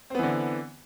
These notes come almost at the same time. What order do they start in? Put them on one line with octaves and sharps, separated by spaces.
C4 B3 E3 D3